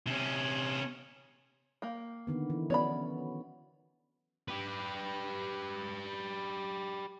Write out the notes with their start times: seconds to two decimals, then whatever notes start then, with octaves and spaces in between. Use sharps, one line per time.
0.07 C3 C#4
1.82 A#3 G5
2.27 D3 D#3 B3
2.50 E3
2.70 F#3 B3 C#4 C#5 D5 B5
4.48 G4 B4